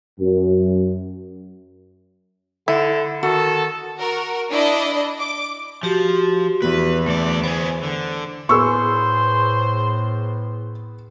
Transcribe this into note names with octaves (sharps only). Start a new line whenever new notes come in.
F#2
D3 E4
D#3 F#4 A4
F#4 A#4
D4 E4 D5 D#5
D6
F3 F#4 G4
E2 B4
D2 A3 D5
B3 G#4 C5
D3
A2 B3 G#4 C5 C#6 E6